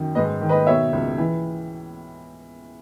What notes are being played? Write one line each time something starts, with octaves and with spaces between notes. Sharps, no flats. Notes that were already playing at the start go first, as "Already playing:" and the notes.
Already playing: F#2 D#3
G#2 B4 D#5
D#3
B4 D#5
B2 C#5 E5
C#2
E3